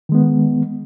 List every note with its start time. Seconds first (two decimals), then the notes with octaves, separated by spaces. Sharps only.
0.09 D#3
0.12 G#3
0.15 B3